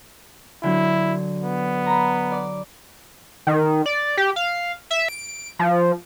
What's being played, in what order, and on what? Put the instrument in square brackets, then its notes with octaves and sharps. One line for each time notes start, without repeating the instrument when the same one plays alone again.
[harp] D3 F#3 [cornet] E4
[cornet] B3
[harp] A#5 B5
D5
[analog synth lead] D#3
D5
G4
F5
E5
D7
F3